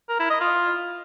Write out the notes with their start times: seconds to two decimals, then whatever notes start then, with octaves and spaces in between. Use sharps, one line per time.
0.09 A#4
0.20 E4
0.30 D#5
0.40 F4